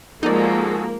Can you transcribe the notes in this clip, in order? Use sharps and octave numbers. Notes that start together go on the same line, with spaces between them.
F3 G#3 A#3 D#4 F#4 G#4 A4 D5